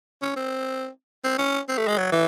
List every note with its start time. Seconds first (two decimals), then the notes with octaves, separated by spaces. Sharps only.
0.22 C#4
0.36 C4
1.24 C4
1.39 C#4
1.69 C4
1.78 A3
1.88 G#3
1.98 F#3
2.12 E3